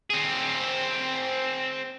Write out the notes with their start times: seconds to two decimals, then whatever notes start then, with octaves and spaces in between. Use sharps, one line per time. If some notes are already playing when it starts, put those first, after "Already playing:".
0.10 C4 G#4